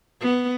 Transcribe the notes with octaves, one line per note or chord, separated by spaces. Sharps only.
B3